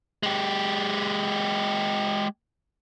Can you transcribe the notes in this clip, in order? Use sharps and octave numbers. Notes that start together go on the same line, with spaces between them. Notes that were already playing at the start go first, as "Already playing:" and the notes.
G#3 G4